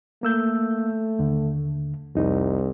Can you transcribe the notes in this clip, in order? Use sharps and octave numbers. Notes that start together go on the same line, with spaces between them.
A3 A#3 E6 G6
D#2 D3
C2 F2 D#4